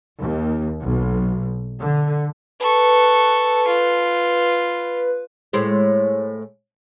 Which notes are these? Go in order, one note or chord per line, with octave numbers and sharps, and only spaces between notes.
D#2
B1
D3
A4 B4 C#6
F4
A2 G#3 C5